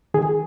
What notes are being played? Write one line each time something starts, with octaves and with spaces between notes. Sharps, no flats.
D#3 G#4